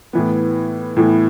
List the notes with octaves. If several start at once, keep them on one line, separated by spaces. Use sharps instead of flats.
A2 E3 B3
A2 E3 B3